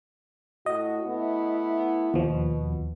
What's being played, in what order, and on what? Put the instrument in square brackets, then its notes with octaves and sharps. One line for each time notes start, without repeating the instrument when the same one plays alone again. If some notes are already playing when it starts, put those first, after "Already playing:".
[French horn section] A2 F#4 [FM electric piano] D#5
[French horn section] A3 B3 E4
[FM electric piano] D#2 F3 [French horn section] B2